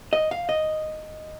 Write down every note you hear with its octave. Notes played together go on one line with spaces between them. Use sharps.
D#5
F5
D#5